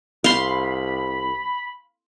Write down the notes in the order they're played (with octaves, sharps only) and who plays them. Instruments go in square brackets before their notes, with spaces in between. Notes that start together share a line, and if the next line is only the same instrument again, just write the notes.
[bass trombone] C2 [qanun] F5 C6 [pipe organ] B5